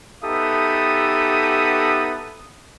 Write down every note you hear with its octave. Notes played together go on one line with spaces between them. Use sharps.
B3 D#4 G4 A4 E5 D#6